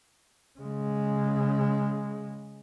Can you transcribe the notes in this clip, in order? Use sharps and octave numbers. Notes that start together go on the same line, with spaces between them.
C#3 G#3